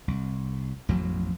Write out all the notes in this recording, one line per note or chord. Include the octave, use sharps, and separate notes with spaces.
C2
A1 F2 B2 F#3